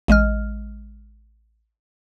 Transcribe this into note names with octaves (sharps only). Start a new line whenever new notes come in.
A1 G#3 D#5 F6